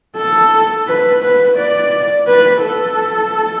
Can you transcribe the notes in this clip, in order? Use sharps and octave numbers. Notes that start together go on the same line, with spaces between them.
A4
B4
B4
D5
B4
A4